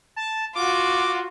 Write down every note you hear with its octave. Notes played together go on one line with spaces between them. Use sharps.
A5
F4 F#4 D6